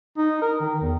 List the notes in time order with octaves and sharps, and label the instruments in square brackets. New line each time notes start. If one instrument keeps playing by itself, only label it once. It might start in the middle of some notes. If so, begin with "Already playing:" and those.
[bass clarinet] D#4
A#4
D#3
E2